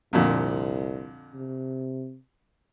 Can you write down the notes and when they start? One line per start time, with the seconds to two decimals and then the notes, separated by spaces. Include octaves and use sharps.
0.13 C2 F2 A#2 D3
1.34 C3